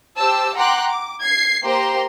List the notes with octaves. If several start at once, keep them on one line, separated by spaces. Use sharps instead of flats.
G4 C5 A5 E6
F#5 G5 A#5 C6 D6 F#6
D6
G#6 C7
A#3 G4 C5 A#5 C6